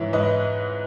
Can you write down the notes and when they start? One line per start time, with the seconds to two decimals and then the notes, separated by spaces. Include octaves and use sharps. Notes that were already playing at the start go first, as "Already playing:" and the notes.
Already playing: G#2 E3 C#5 E5
0.13 G#2 B4 D#5